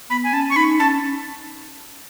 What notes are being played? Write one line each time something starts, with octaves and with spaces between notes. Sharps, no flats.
B3 B5
G#5
C#4 A5
C#6
D#4 B5
C#4 A5